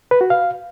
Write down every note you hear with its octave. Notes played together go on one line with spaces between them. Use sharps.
B4
F#4
F5